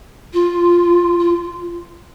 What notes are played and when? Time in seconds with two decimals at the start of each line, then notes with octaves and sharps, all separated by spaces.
0.33 F4
1.19 F4